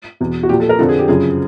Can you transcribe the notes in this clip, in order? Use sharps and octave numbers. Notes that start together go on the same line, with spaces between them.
E2 B2
F#4
A#2 F3 G4
A4
A#4
F2 D3 F3 A4
G#4
G4
F#2 C#3 F3 G#4